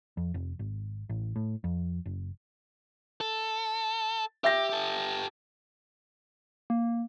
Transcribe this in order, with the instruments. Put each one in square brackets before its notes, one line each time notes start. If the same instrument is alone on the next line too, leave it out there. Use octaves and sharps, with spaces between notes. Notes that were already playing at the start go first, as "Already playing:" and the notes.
[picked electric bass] F2
F1
G#1
A1
A2
F2
F#1
[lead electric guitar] A4
[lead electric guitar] G4 [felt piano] E5 G6 A#6
[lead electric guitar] G4 A4
[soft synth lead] A#3